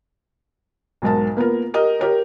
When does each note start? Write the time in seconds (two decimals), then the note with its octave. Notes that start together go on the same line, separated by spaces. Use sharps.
1.02 B1 G#2 A#4 A5
1.37 A#3 B3 F4 A#4
1.74 G4 A#4 D#5
2.00 G4 A#4 C#5